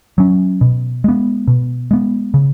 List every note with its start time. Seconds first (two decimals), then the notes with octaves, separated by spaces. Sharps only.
0.18 F#3 C#4
0.61 B2
1.04 G#3 B3
1.48 B2
1.91 G#3 B3
2.34 C#3